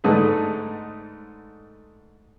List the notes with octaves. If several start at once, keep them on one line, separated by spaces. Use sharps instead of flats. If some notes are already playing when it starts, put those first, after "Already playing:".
G#2 D3 A3 D#4 G#4 B4